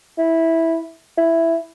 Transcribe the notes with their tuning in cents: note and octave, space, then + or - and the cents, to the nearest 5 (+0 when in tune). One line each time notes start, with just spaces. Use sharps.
E4 -10
E4 +5